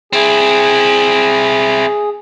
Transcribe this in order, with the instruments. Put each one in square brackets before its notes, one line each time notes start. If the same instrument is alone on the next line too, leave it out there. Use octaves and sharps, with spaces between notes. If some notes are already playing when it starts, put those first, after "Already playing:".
[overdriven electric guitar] C4 E4 [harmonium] G#4